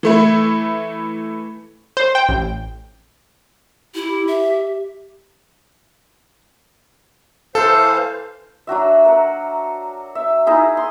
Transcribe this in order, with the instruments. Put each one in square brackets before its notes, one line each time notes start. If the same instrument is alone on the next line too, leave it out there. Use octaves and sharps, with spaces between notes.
[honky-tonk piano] E3 A3 E4
[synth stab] C5
G5
A1
[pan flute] E4 [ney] G4
[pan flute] E5
[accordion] E3 C5 F5 [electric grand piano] A4
[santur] F#3 D4 F#4 E5
A#4 F#5
E5
D#4 E4 G#4
C6